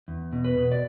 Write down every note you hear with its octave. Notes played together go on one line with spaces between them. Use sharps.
E2
B2
B4
B2
D5